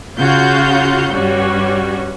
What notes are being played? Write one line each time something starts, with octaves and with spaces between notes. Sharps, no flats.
C#3 F4 F#4 F5 F#5 G6
G2 G3 C#4 F#4